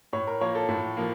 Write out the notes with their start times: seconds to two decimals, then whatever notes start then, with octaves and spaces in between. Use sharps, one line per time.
0.13 A2 C#5
0.27 A#4
0.41 F3 A#3 C#5
0.55 A4
0.68 A2
0.97 F3 A#3